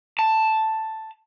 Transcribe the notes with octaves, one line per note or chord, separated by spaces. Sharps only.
A5